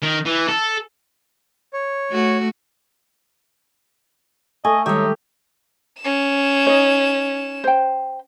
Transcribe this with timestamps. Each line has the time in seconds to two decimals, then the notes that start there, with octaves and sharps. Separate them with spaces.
0.02 D#3
0.26 E3
0.49 A4
1.73 C#5
2.10 A3 F#4
4.65 A3 D#5 G#5
4.86 D#3 G3 G#3 D#4 G4 C#5 E5
6.00 C#4 E7
6.67 D#4 C#5
7.64 C5 G5